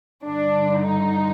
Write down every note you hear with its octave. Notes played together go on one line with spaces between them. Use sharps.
G2 D3 D4
D#4